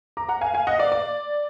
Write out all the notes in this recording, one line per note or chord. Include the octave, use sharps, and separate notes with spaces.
A#5 D6
F#5 A#5
F5 G#5
F5 G#5
D#5 F#5
D5 F5
D5